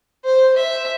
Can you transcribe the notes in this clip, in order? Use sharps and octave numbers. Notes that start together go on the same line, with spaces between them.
C5
E5